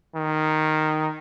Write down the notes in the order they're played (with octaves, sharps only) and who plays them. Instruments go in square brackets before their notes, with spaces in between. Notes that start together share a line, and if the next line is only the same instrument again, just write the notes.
[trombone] D#3